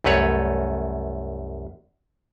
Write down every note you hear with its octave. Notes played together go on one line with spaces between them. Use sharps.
C2 F#2 A3 B4 C#5